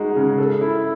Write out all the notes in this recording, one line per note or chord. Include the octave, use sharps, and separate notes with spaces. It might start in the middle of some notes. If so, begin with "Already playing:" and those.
Already playing: G#3 D#4 F#4
C#3
A4
E4